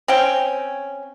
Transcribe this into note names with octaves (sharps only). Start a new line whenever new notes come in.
C4 C#4 G5